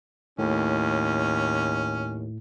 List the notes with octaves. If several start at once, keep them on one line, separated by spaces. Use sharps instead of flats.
D#2 A2 C#4